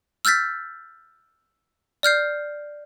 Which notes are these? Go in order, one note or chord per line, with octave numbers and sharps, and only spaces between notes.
E6 F6 G6 A6 B6
D5 F6 G6 C7